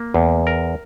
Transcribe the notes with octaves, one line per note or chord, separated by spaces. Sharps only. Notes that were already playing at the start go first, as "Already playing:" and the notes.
Already playing: A#3
E2
A#4